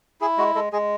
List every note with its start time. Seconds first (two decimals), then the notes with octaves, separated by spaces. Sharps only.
0.21 E4 G#4
0.38 G#3 F#4
0.55 G#3 A4
0.73 G#3 G#4